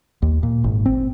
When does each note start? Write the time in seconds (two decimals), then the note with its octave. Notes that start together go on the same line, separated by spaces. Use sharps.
0.22 D#2
0.43 A#2
0.64 G#1
0.86 C4